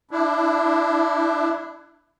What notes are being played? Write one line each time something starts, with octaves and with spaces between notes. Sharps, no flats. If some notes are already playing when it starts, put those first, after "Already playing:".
D4 E4